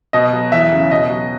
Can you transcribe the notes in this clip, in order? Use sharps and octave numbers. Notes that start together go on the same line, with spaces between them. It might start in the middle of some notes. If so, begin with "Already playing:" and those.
B2 D#5
F#3
E2 E5
C#3 F#3
B2 D#5
F#3